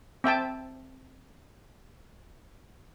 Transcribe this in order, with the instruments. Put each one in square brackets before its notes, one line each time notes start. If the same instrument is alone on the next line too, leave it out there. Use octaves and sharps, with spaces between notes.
[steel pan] C4 E5 G5 A5